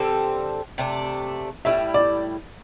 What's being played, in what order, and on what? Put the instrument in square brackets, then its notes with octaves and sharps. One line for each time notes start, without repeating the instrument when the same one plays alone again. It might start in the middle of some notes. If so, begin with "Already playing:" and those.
Already playing: [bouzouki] D3 G3 C4 A4
C3 A3 D4
[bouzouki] A2 G3 E4 [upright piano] E5
[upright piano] D5